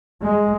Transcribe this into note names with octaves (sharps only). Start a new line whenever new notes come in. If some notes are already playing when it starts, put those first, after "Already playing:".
G#3